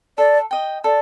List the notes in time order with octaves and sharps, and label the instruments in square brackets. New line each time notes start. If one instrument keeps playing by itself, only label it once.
[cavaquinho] A4 [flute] D5
[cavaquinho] D#5 G5
[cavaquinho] A4 [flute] D5